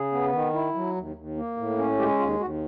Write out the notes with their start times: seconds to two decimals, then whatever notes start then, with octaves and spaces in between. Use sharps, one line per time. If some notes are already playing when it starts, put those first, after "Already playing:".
Already playing: C#3 G#4
0.12 B3
0.33 D#3
0.54 E4
0.75 F#3
0.96 D#2
1.16 D#2
1.37 A#3
1.57 A2
1.78 C#4
1.98 G#3 G4
2.19 D#2 F4
2.39 D#2 F#4